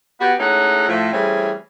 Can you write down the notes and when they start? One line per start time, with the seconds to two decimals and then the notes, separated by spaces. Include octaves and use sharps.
0.21 B3 F#4 G4
0.40 G#3 A3 C#4 D#4 E4 F#5
0.88 A2 F3 A3
1.12 E3 G3 A3 C4 C#4 G#4